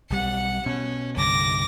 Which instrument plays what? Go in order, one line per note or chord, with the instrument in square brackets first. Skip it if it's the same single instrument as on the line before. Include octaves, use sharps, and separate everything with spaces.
[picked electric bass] B1 G3 [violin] F#5 C#7
[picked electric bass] B2 [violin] C#4
[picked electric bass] C2 G2 D3 [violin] D6 A#6